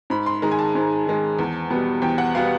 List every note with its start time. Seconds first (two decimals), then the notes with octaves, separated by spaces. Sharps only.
0.10 G#2 B5
0.26 C6
0.42 D#3 G#3 A#5
0.52 G#5
0.59 A5
0.75 G#2
1.07 D#3 G#3
1.39 E2
1.70 B2 G3 B3
2.02 E2 G5
2.18 F#5
2.35 B2 G3 B3 F5